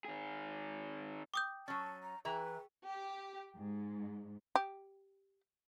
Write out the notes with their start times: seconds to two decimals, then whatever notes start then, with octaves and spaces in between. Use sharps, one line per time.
0.05 D#3 G#4
1.34 G5 D6 D#6 G6
1.68 F#3 C#4 A5 A6
2.03 A#5
2.25 E3 E4 G#4 B4 G5 A#5 C#6
2.87 G4
3.55 G#2
4.55 G4